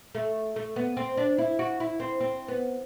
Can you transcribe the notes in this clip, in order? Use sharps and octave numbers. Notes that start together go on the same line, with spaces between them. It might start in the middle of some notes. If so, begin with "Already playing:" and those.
A3
A3
B3
C4
D4
E4
F#4
E4
C4
C4
B3